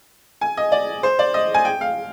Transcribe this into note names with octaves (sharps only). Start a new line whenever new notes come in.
G#5
D#5
D5
C5
D5
D#5
G#5
G5
F5